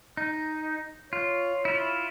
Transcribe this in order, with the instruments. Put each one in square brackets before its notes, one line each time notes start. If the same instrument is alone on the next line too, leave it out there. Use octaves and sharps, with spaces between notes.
[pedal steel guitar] D#4
[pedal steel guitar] F4 [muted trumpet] C#5
[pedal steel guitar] E4 F4